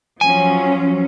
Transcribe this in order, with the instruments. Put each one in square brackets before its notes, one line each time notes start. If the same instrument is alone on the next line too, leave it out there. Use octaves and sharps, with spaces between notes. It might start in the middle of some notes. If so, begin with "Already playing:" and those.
[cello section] F3 F#3 C#4 [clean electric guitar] G#5